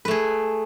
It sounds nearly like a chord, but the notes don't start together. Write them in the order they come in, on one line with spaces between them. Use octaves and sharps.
B4 A3 G#4